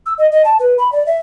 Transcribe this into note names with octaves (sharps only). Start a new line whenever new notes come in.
E6
D#5
D#5
A5
B4
B5
D5
E5